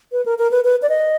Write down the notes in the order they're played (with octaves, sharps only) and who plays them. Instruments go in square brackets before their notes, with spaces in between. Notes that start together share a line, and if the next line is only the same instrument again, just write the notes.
[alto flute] B4
A#4
A#4
B4
B4
D5
D#5